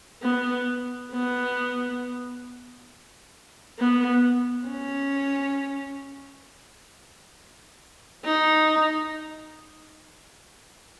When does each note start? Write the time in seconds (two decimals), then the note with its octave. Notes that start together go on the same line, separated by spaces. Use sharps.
0.22 B3
1.12 B3
3.79 B3
4.68 C#4
8.24 D#4